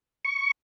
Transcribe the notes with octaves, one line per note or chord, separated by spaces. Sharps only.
C#6